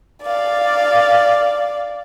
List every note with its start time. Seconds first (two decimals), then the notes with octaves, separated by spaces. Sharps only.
0.23 D5 F5